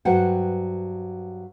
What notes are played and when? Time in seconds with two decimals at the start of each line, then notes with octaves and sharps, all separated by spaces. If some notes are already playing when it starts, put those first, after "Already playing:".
0.05 G2 F#3 B4 C5 F#5 G5